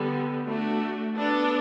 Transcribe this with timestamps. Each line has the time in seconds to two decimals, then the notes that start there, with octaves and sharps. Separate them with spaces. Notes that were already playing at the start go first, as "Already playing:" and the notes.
Already playing: D3 G3 B3
0.47 A3 D4 F#4
1.15 B3 D4 A4